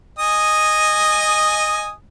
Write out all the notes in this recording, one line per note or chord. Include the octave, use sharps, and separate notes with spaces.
D#5 G#5 D#6